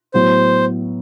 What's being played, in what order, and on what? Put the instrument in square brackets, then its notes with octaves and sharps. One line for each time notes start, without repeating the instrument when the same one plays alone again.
[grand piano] A2 F#3 B3 [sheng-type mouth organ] C5